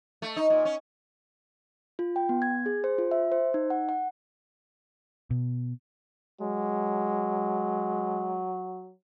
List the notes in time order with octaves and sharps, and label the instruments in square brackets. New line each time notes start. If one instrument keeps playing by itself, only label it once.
[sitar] A3
D#4
A#2
C#4
[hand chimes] F4
G5
B3
G#6
G#4
C5
F4
E5
C5
D#4
F#5
F#5
[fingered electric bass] B2
[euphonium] F#3 [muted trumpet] G#3